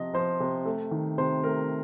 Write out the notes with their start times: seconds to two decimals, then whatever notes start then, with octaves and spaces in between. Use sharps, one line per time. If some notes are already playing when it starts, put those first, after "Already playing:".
Already playing: C3 F3 D#5
0.14 F3 C5
0.40 C3
0.65 A3
0.91 D#3
1.18 C3 C5
1.44 A3 A#4